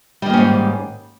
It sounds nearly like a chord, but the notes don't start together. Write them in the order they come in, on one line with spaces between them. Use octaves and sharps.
G3 D#3 A#3 C#4 G#2